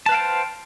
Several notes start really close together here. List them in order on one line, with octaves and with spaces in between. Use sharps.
A5 B4 F5 G5 C5